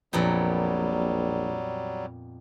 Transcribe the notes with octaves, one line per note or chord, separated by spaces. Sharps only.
A#1 F2 A#2 F#3 G3 B3